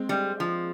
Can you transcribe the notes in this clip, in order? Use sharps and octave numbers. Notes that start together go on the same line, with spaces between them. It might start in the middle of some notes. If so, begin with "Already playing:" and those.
Already playing: G#3 C4
G3
F3